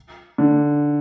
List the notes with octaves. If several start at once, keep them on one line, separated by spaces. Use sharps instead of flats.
D3